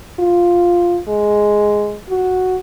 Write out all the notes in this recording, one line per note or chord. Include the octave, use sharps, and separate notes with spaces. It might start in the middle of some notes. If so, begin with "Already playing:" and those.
F4
G#3
F#4